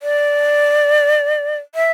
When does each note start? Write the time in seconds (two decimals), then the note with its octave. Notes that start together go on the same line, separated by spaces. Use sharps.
0.02 D5
1.75 E5